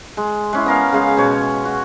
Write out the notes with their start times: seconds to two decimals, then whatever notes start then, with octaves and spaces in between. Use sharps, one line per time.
0.17 G#3
0.53 G#3 C#4 E4
0.66 B3 A#4 F5
0.93 C#3 G#3 F5
1.17 B2 C#5
1.65 F#4